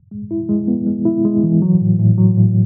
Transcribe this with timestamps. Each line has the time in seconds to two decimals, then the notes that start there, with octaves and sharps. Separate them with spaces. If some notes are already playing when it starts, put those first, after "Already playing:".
0.11 G#3
0.31 E4
0.49 G#3
0.68 B3
0.87 G#3
1.05 E4
1.25 G#3
1.43 E3
1.62 F#3
1.81 A2
1.99 A2
2.18 F#3
2.37 A2